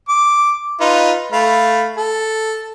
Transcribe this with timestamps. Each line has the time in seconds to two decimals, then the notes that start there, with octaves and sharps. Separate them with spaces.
0.09 D6
0.81 D#4 F4 B4
1.33 A3 F5 B5
1.97 A4